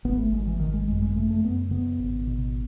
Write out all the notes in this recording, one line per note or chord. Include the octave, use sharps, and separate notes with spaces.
G#1 B3
A3
G#1 G#3
E3
G#1 D#3
G#3
F#2 G#3
G#3
C#3 A3
A3
F#2 B3
C#3 B3
G#1
B2